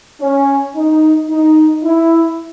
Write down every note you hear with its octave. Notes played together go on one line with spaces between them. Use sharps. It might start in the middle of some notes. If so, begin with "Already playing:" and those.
C#4
D#4
D#4
E4